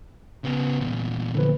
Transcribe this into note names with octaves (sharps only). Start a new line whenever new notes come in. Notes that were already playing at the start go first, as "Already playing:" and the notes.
C#3 B3
E2 A#2
D3 F3 B4